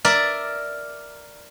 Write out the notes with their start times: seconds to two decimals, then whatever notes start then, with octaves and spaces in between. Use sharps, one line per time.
0.05 A#4 D5 E5